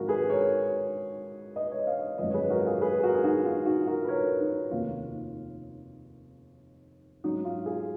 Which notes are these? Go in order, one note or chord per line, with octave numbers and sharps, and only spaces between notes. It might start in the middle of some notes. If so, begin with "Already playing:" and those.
Already playing: G#1 G#2 F3 G#3 F4 F#4 A#4
G#4 B4
A#4 C#5
B4 D#5
C#5
D#5
C#5 F5
G#1 F#2 F3 B4 D#5
C#5
G#4 B4
F#4 A#4
F#4
F4 G#4
G#4 B4
G#4
F#4 A#4
G#4
D#4 F#4
F4
D#4 F#4
F#4 A#4
B4
A#4 C#5
D#4
F1 D#2 D#3 A#3 C#4 F4
G#2 F#3 C#4 D#4 F#4
F4
F4 G#4